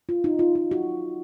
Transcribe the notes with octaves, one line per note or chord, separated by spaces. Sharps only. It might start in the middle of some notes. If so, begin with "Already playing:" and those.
F4
D#4
F4
F4
F#4